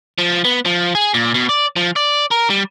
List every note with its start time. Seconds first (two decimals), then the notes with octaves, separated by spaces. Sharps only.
0.18 F3
0.45 B3
0.66 F3
0.95 G#4
1.14 A#2
1.34 B2
1.49 D5
1.76 F3
1.96 D5
2.31 A#4
2.50 G3